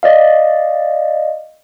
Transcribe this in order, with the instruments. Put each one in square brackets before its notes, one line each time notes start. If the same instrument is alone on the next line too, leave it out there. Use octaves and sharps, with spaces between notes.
[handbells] D5 D#5 F5